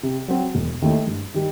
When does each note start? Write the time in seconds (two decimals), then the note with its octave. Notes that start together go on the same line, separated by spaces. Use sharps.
0.03 C3
0.28 F#3 C4 F#4
0.55 E1
0.82 D#2 D#3 A3 E4
1.07 G2
1.34 D#3 G3